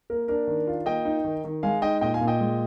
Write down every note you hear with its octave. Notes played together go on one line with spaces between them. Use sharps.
A#3 A#4
D4 A#4
D#3
F4
A#3 D#5 G5
D#4
D#3
D#3
G#3 F5 G#5
D#4 D#5 G5
A#2 D#5 G5
F5 G#5
A#2
D#5 G5
G#3